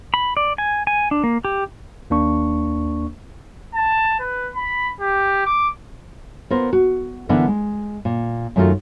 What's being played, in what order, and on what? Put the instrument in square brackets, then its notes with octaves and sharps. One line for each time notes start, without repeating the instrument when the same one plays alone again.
[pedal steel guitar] B5
D5
G#5
G#5
D4
A#3
G4
[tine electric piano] D#2 A#3 D4 C#6
[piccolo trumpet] A5
B4
B5
G4
D6
[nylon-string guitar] B3 F4 A#4 C5
F#4
D3 E3 B3 D4 E4 A#4
G#3
A#2
F#2 D#3 A3 C4 F4 F#4